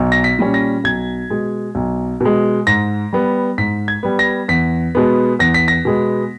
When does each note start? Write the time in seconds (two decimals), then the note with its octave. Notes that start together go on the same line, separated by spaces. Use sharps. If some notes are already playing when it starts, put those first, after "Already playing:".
Already playing: B1
0.12 A#6
0.24 B6
0.39 A#2 G3 C#4
0.54 A#6
0.84 B1 G#6
1.30 B2 G#3
1.75 B1
2.20 B2 G#3
2.67 G#2 A#6
3.13 G3 B3
3.58 G#2 B6
3.88 G#6
4.03 G3 B3
4.19 A#6
4.48 E2 B6
4.95 B2 G#3 B3
5.39 E2 A#6
5.54 B6
5.68 A#6
5.85 B2 G#3 B3